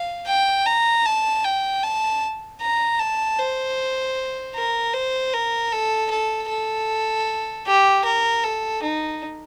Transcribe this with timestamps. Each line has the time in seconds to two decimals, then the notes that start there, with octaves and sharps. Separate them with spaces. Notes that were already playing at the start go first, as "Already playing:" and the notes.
Already playing: F5
0.27 G5
0.66 A#5
1.06 A5
1.44 G5
1.83 A5
2.62 A#5
3.00 A5
3.39 C5
4.55 A#4
4.94 C5
5.34 A#4
5.72 A4
6.10 A4
6.50 A4
7.67 G4
8.05 A#4
8.44 A4
8.83 D#4